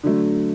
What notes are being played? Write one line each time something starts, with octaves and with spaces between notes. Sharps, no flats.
D3 F#3 A3